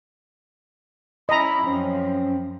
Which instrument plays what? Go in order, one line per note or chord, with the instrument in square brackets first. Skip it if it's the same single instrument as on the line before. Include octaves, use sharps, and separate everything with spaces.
[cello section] C#4 E4 [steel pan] D#5 A#5 [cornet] B5
[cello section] F#2 F3 [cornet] C4 [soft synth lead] C#4